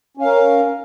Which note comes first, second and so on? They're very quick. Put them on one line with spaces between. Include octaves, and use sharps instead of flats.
C#4 F5 A#4